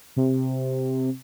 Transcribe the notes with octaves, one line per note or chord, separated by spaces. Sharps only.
C3